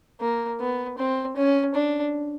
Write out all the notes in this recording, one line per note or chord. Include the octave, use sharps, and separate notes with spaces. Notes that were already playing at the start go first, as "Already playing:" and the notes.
A#3
B3
C4
C#4
D4